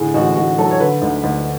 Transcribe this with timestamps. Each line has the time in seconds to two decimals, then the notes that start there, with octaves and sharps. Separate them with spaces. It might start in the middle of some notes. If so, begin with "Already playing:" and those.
Already playing: A2 D3 G#4
0.14 A1 F#4
0.36 A1 F#4
0.58 F#3 A4
0.71 C#5
0.80 D3 B4
1.02 D2
1.24 D2